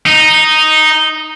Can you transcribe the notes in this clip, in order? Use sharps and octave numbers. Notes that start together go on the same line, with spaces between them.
D#4